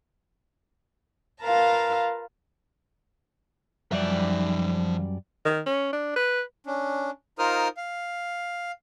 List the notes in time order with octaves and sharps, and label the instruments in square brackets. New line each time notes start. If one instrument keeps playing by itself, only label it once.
[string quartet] F4 A#4 B4 F5 A5 A#5
[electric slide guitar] F#2 G3 D5 [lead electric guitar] F3 E5
[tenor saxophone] D#3
C#4
D4
B4
[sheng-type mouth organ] C#4 D4
D#4 F4 A#4 C5 D#6 F6
F5